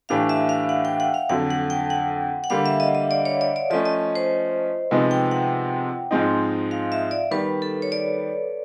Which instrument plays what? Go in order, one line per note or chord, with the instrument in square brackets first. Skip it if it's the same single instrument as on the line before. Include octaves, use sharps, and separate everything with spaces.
[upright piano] A2 E3 A3 D4 G4 [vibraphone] F5
[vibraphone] E5
F5
F#5
G5
F#5
F5
[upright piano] F2 D3 F#3 [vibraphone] F#5
[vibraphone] F#5
G5
F#5
F#5
[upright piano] D3 G3 A#3 [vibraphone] F5
[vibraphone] E5
D#5
D#5
D5
C#5
D5
D5
[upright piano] F3 A3 C#4 [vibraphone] D#5
[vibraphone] D#5
C5
[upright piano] C3 F3 G#3 B3 D#4
[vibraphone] G5
F#5
[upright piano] G#2 F3 G#3 C4 D#4
[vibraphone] F5
E5
D5
[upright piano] D#3 G3 B3 [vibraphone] B4
[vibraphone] A4
C#5
D5